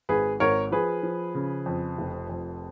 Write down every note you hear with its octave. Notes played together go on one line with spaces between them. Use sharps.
G#1 G#4 B4
G#1 A#4 C#5
F3 G#4 B4
F3
C#3
F2
F1
F2